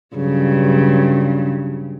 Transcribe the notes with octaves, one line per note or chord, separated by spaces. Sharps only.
G2 C#3 F#3